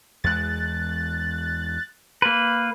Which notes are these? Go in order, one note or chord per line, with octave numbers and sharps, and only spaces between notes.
E2 G#3 F#6 A6
A#3 B4